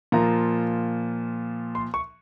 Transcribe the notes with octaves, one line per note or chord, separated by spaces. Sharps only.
A#2 F3 A#5
C6
C#6